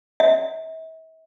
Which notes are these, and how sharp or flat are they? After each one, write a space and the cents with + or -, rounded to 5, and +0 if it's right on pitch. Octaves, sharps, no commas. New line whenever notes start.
E5 -40